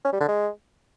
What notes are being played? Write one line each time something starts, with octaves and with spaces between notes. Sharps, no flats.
C#4
G3
D3
G#3